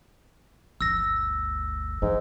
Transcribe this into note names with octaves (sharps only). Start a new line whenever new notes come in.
G1 D2 E6 A#6
G#2 E3 A#3